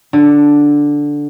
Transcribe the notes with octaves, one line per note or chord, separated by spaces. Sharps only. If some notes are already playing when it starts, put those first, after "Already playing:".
D3